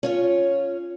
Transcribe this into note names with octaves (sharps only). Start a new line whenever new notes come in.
C#4 F4 C#5